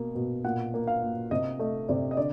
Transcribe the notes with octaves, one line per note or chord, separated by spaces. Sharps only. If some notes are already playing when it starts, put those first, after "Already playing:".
Already playing: B2 A#3
B2
A#2 F#5
A#3
F5
A#2
C3 D#5
A3 D#5
C3 D5
D#5
D3 D5